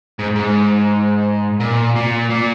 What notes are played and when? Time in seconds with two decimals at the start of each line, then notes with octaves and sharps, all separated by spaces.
0.19 G#2
0.35 G#2
1.60 A#2
1.96 A#2
2.30 A#2